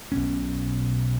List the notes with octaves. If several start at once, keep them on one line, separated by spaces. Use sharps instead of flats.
B1 B2 A#3 C#4